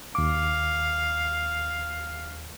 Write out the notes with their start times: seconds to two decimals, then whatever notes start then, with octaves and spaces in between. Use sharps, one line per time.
0.15 D#2 F5 D6